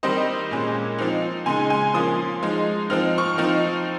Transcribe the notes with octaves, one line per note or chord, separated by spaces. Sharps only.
D#3 G3 C4 D#4 C5 D#5
A#2 G#3 C#4
F3 C4 D#4
C#3 G#3 D#4 G#5 C6
G#5 C6
F3 A#3 C#4 C6 D#6
F3 G#3 D#4
F3 C4 D#4 F6
C#6 F6
F3 C4 D#4